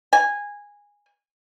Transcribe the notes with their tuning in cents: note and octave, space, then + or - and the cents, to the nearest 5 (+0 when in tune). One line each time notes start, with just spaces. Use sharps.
G#5 -15